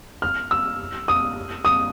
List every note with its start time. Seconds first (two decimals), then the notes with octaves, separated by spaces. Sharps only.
0.22 F6
0.51 E6
1.08 D#6
1.65 D#6